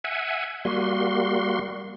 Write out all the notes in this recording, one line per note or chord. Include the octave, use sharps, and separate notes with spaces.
E5 F#5 G#5
G3 A#3 F#4 C6